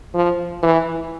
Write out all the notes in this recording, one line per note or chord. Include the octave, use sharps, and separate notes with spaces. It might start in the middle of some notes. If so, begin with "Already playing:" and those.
F3
E3